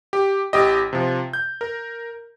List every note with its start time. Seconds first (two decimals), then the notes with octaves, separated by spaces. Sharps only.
0.13 G4
0.53 A1 G4 D#5
0.93 C3 F3
1.33 G6
1.61 A#4